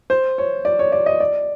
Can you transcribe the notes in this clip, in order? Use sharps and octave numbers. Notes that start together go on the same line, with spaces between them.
C5
C#5
D5
C#5
D5
D#5
D5